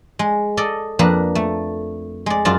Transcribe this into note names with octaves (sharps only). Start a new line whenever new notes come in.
G#3
A4 D5 D#5
F2 A#3 D4 B4
A3
G#3 D5
F#2 F4 D5 A5